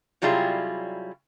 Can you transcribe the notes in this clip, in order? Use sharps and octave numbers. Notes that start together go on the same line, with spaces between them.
C3 F#3 G3 E4 F4 G#4